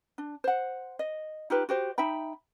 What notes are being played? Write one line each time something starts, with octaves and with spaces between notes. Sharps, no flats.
D4
C5 F#5
D#5
D#4 F4 G4 B4
F#4 G4 C5
D#4 E5 G5 B5